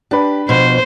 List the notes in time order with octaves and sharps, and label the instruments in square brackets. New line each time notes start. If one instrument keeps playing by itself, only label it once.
[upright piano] D4 B4 [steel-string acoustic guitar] G4
[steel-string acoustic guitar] B2 F3 [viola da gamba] C5